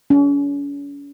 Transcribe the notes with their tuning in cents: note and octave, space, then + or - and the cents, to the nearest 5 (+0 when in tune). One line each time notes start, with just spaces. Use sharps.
C#4 +40